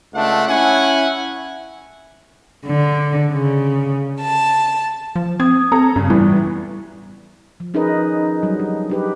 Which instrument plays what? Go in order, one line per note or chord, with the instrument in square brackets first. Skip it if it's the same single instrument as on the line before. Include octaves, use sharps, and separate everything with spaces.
[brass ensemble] C#2 A3 D4 F#5
C#4 E4 F#5 G#5
[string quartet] D3
C#3
A5
[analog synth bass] F3
[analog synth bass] C4 [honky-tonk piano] D#6 G#6
[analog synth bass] C4 [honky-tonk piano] A4 A#5
[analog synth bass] G2 [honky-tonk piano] C#3
[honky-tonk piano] A2 E3 B3 [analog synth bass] G3
[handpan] F3
C#4 D#4 G#4 A#4 B4 D#5
F#3 G3
D4
D4 G4 B4